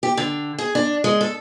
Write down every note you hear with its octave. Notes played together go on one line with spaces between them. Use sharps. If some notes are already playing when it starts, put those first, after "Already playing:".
G4
D3
G#4
D4
G#3
A4